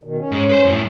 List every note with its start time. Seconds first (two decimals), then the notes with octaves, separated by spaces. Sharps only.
0.03 B2 D#3
0.18 C#4
0.32 G#2
0.49 B4 C5
0.65 F#2 A2